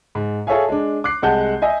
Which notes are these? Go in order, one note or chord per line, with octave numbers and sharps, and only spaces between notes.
G#2
G#4 A4 C#5 E5 F5 G#5
G#3 D4
D6 F#6 C7
C2 G#3 F#5 A5 G6
D#5 E5 G#5